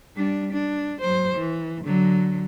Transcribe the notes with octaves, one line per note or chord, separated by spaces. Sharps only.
G3 D4
D4
F#3 C5
E3
D3 F#3